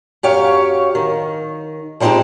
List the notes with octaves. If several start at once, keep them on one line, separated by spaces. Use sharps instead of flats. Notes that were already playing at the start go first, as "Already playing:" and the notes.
F#2 G4 C#5 F5
D#3
F3 G3 G#3 C4 D#4 G4